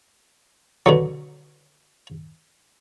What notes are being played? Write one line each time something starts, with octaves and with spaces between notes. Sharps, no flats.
B2 D3 F#3